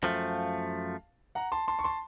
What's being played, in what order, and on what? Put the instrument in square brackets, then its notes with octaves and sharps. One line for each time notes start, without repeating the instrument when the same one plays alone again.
[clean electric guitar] F#2 F3 A3 [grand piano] F5 A5
[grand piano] F#5 A#5
A5 C6
A5 C6
C#6
A5 C6